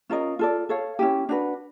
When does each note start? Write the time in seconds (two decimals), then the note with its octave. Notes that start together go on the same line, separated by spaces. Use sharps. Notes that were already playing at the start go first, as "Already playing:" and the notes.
0.10 C#4 F4 A#4 D#5
0.39 F4 A4 D5
0.69 A4 C#5 F5
0.99 C#4 E4 G4
1.29 D4 F#4 B4